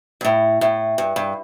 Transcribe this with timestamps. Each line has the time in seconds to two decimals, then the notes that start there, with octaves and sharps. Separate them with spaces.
0.21 G2
0.25 A2
0.61 A2
0.98 G2
1.16 G2